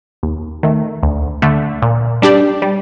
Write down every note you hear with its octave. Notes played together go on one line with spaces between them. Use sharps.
D#2
D#3 A3
D2
D3 A3
A#2
G3 D4 G4 D5
G3